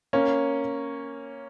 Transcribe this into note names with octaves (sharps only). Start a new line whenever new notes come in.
A#3 C#4